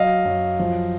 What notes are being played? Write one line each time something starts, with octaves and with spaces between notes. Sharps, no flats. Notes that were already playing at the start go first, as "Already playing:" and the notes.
Already playing: F#3 D#5 F5
F#2
F3